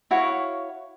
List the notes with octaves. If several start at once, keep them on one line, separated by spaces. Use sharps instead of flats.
E4 F#4 C#5 F5